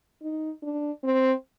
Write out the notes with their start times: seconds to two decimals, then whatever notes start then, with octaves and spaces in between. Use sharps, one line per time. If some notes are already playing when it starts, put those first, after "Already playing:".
0.22 D#4
0.63 D4
1.04 C4